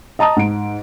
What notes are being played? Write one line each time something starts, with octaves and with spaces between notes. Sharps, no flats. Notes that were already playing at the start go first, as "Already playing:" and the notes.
D#5 A5 A#5 D#6
G#2 D7